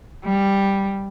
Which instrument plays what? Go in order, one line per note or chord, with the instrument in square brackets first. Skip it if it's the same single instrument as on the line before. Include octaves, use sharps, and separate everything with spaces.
[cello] G3